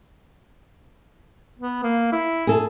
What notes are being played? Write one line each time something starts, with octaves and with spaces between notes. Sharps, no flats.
B3
A#3
E4
G#4 A4